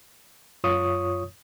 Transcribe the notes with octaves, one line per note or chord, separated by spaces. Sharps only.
F#2 F4 C#5 C#6 D#6